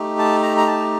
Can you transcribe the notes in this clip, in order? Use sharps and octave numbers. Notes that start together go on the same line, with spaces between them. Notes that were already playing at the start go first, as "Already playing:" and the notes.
Already playing: A3 D#4 G4
A5
A#5
A#5
A5